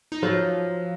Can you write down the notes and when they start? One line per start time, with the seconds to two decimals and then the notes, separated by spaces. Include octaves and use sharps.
0.12 D#4
0.23 F3 F#3 F4